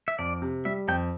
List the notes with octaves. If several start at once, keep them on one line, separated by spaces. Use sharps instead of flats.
E5
F2 D5
C3
G3 E5
F2 G5